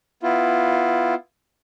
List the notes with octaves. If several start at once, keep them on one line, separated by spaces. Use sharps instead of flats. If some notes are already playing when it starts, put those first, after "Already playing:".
B3 E4 F4